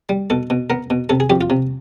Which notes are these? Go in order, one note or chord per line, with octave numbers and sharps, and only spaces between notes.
G3
B2 A4
B2
B3 A#4
B2
C3 A4
G#4
F2 G4
F4
C3